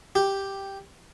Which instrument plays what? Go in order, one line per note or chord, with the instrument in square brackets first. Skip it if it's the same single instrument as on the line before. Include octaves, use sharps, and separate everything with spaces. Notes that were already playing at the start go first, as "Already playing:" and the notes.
[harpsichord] G4